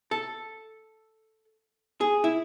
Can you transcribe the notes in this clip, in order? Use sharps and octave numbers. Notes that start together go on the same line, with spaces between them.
A4
G#4
E4